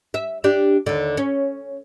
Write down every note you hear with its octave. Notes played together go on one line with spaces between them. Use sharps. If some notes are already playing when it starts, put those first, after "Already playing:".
E5
D4 G4
D#2 D3
C#4